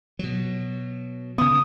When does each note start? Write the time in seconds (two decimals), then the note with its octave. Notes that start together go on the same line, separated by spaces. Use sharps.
0.19 B2 F#3
1.38 C#3 B3 D#6